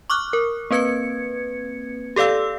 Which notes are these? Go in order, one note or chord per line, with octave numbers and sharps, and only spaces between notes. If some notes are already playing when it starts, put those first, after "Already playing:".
C#6 D6 F6 F#6
A#4
A#3 C4 B4 G#6 C#7
G4 A4 D5 F5 E6